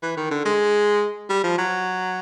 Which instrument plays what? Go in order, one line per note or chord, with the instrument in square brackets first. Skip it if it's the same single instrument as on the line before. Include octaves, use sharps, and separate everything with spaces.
[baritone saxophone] E3
D#3
D3
G#3
G3
F3
F#3